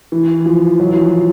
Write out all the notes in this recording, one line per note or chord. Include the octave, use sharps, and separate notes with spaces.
E3
F3
F#3
E3
F3